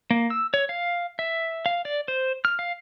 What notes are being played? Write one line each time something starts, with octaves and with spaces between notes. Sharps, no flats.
A#3
E6
C#5
F5
E5
F5
D5
C5
F6
F5